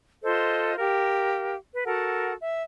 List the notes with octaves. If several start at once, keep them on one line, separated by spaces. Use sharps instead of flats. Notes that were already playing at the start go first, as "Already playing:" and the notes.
F4 A4 C5 D#5
G4 A#4 F5
B4
F#4 A4 A#4 F#5
E5